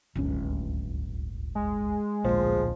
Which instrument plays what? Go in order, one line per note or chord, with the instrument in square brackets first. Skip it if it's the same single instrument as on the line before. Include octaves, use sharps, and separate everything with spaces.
[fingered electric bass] D1 C#4 [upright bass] G1 C#2
[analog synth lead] G#3
[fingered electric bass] D1 A#1 [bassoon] F3